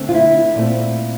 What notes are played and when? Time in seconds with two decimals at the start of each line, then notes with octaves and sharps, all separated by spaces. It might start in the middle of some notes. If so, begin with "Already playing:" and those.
Already playing: D3 A3 C4
0.09 F4
0.14 E4
0.55 A#2 A3 C4